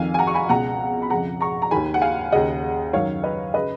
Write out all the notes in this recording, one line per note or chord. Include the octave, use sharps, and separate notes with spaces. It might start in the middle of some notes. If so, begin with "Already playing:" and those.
Already playing: F2 D#3 F5 G#5
G#5
F#5 A#5
C#6
G#5 B5
C#2 B2 F#5 A#5
B5
F2 C#3 F#5 A#5
A#5 C#6
A#5
D#2 D#3 G#5 B5
F#5
F5 G#5
D#2 C#3 D#5 F#5
F#2 D#3 C#5 F5
B4 D#5
C#3 B4 D#5